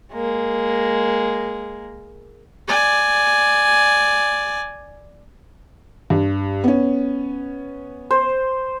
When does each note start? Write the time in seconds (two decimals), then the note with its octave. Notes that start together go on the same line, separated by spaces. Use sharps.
0.13 G#3 A#3
2.68 D5 G#5
6.10 G2
6.64 B3 C#4
8.11 C5